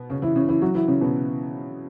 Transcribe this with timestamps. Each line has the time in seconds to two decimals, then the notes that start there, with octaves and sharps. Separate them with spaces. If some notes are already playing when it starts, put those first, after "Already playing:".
Already playing: B2 B3
0.10 C#3 C#4
0.22 E3 E4
0.36 C#3 C#4
0.48 E3 E4
0.62 F#3 F#4
0.75 E3 E4
0.88 C#3 C#4
1.01 B2 B3